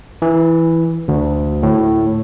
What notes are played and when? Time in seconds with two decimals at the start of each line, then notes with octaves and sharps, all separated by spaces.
0.22 E3
1.08 D2
1.63 A2